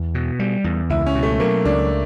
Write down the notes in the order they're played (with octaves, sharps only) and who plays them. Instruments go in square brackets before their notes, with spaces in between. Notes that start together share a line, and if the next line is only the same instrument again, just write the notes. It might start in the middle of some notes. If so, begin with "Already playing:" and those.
Already playing: [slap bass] E2
B2
G3
E2
[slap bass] C#2 [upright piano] E4
[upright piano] C#4
[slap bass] B2
[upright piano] A3
[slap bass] F#3 [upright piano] A#3
[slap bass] C#2 [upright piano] D4